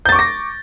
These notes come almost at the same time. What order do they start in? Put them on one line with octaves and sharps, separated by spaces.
G6 A6 C#6 D6 A#6